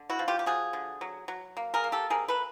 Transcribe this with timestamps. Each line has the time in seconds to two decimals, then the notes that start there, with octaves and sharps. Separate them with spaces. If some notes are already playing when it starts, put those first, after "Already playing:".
Already playing: D3
0.10 E4 F#4
0.19 F3
0.28 F4 G4
0.39 G4
0.46 F3 F#4 G#4
0.73 D3
1.01 F#3
1.28 F#3
1.57 A#3
1.74 G#4 A#4
1.84 A#3
1.92 G4 A4
2.10 C3 G#4 A#4
2.28 A4 B4